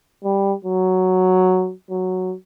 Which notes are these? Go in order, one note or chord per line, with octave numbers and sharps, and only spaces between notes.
G3
F#3
F#3